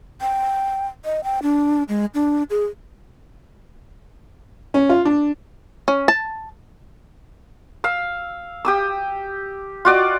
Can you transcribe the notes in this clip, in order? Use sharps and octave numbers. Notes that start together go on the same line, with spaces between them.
G5
D#5
G5
D4
G#3
D4
G#4
C#4
F4
D4
C#4
A5
F5 E6
G4 D#6 E6
F4 F#4 D5 D#5